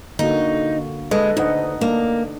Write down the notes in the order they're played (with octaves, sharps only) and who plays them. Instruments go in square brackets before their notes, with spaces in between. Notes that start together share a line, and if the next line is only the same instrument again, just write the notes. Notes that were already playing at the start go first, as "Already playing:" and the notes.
[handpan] D3 A#3 F#4 [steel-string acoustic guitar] D#4
[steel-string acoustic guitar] G#3 [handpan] A4 B4 D#5
[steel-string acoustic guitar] D2 [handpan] D#4 D#5 F#5
[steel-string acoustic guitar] A#3 [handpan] D4